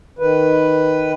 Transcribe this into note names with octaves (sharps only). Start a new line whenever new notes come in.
D#3 B4